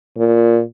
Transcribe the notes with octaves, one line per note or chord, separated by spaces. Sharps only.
A#2